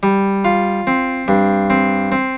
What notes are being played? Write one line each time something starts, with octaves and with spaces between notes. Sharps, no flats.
G3
F4
C4
G2
C4
C4